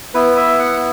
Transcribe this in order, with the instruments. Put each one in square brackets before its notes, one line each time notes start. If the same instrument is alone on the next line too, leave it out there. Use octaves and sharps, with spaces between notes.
[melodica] B3 E4 B4
E5
F#5